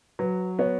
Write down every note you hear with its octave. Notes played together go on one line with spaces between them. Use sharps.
F#3 B4
B3 C#5